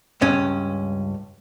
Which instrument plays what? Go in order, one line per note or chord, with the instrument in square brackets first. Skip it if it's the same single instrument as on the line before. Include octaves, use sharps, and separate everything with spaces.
[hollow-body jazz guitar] C#2 G2 C#4